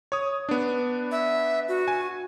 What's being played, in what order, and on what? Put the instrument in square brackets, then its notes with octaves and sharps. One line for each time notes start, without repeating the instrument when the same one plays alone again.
[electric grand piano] C#5 D#6
B3 D4
[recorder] E5
F#4
[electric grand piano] G#5